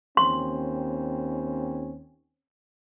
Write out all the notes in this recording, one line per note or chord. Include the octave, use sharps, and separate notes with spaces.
D#2 C4 C#4 C6